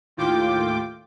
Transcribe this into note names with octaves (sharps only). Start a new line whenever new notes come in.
D#2 A2 F4 G5 D6